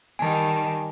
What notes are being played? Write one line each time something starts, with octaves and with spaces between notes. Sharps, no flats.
D#3 G3 G#5 A5